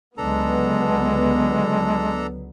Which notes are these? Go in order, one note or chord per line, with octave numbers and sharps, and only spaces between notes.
C#2 D3 F#3 G#3 B3 D4 A4 A#5